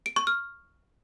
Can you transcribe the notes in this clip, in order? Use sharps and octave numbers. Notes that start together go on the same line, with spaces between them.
D7
C#6
F6